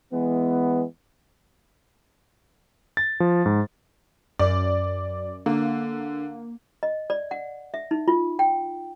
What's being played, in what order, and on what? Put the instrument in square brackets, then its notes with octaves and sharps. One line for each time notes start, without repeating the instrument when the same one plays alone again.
[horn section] E3 G#3 B3
[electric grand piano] A6
F3
G#2
[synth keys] F#2 [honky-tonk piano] D5
[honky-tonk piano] D3 [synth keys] A#3
[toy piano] D#5
D5
F#5
E5
D#4
F4
G5